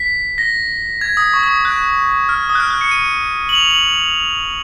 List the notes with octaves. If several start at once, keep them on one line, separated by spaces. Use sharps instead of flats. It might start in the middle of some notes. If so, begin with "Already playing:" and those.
Already playing: B6
A#6
G#6
D#6
C#6
D#6
F#6
F6
D#6
F#6
F6
F#6
C#7
D#7
F#7
F7
F#7